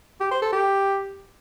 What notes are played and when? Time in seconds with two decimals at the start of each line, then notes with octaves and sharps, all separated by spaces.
0.20 G4
0.31 C5
0.42 A4
0.53 G4